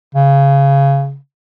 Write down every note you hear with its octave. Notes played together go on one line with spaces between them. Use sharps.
C#3